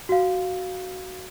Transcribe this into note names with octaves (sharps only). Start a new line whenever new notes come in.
F#4 F5